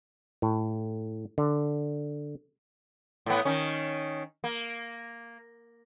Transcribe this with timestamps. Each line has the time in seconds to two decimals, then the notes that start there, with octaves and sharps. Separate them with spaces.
0.42 A2
1.38 D3
3.26 A2 B3
3.45 D#3 C#4
4.44 A#3